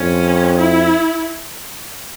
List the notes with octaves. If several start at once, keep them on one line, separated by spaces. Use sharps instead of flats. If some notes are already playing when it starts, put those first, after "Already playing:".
Already playing: F2 C#4
E4